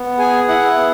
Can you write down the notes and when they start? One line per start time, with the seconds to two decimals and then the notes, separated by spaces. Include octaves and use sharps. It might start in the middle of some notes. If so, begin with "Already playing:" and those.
Already playing: B3
0.18 G#4 G#5
0.48 E4 F#5
0.76 B3